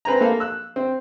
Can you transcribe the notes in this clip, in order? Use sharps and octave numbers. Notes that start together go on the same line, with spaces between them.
C4 B4 C5 G#5 A#5
A#3 A4 F5
E6 F#6
C4